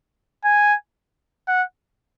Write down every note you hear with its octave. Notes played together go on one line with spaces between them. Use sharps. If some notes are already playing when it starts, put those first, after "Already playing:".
G#5
F#5